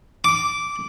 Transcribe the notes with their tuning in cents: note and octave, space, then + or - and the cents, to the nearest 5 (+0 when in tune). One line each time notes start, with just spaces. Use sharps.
D6 -10